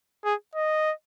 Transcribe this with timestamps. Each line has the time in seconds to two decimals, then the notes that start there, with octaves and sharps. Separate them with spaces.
0.25 G#4
0.55 D#5